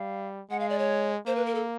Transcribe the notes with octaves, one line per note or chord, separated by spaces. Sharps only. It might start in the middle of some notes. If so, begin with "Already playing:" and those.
Already playing: G3 F5
G#3 F#5
F5
D5
C#5
A#3 C5
B4
A#4
A4